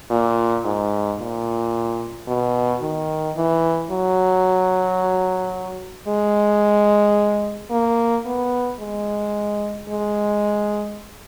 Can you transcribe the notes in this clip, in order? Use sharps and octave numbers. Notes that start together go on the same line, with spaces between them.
A#2
G#2
A#2
B2
D#3
E3
F#3
G#3
A#3
B3
G#3
G#3